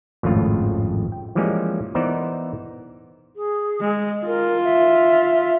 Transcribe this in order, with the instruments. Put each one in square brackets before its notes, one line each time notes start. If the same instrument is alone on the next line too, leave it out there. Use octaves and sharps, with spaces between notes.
[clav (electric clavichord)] G#1 F2 A2 C#3 F4
G5
E3 F3 G3 G#3 A#3 C#4
E3 B3 D#4 A#4 C5 D5
[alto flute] G#4
[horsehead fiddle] G#3
[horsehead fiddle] F4 [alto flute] A#4
[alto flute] E5